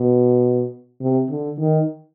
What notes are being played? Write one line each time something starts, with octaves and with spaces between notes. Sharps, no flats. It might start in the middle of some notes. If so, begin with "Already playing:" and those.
Already playing: B2
C3
D3
D#3